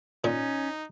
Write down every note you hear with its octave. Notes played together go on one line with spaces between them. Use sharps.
A#2 C#4 D#4